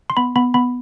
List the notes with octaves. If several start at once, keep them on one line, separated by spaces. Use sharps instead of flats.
C6
B3 B5
B3 B5
B3 B5